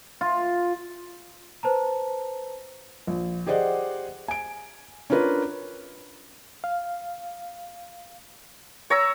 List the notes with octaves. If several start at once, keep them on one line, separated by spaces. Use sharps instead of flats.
F4
B4 C5 A5 A#5
A#1
G4 G#4 C5 D5 D#5 F#5
G#5 D7
C#4 D4 F4 A#4 B4
F5
C#5 A#5 E6